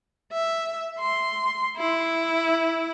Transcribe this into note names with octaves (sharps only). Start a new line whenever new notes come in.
E5
C6
E4